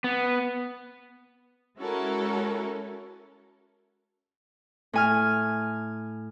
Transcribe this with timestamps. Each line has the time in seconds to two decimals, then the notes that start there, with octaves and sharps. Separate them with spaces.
0.04 B3
1.78 G#3 C#4 E4 F#4 A4 A#4
4.93 A2 G#5 F6